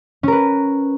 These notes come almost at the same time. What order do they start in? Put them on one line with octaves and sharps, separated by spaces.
C#4 A#4 B4